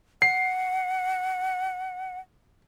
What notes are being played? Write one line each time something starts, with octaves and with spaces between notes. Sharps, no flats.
F#5 C7